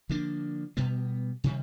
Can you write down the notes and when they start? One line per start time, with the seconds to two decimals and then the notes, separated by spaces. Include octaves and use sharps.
0.09 D3 F3 A#3 D4
0.77 B2 G3 B3
1.44 C3 D#3 G3